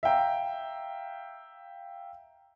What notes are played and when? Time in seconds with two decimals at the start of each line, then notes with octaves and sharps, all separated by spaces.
0.03 E5 F5 G5 A#5